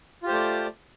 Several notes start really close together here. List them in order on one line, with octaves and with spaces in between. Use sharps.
F4 G4 C5 A3 D5